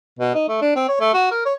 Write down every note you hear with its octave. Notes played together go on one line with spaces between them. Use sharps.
B2
D#4
A3
D4
C4
C#5
A3
F#4
A#4
C#5